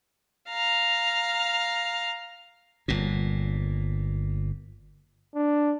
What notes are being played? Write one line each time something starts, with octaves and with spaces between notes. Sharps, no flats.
F5 A#5
G1 A#2
D4